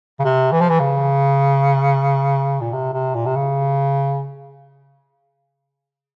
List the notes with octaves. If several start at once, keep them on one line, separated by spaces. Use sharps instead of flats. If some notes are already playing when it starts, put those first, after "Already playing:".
C#3
C3
E3
F3
E3
C#3
A#2
C3
C3
A#2
C3
C#3